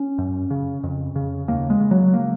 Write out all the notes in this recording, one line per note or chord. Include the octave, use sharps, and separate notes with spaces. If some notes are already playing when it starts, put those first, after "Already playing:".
Already playing: C#4
F#2
C#3
F2
C#3
D#2 A#3
G#3
C#3
F#3
A#3